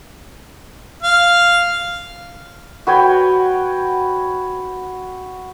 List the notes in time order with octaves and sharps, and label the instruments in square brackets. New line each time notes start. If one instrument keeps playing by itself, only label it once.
[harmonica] F5
[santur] F#4 B4 C#5 G5